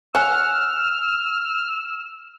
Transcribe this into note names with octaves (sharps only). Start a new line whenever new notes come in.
C#5 F#5 G#5 E6 F6